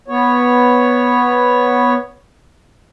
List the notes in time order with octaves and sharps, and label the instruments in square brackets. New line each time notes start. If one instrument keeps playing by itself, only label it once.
[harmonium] B3 C#5